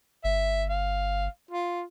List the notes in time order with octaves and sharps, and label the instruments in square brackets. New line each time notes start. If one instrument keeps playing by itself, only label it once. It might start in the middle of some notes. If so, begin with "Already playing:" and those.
[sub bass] G1 [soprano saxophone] E5
[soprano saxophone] F5
F4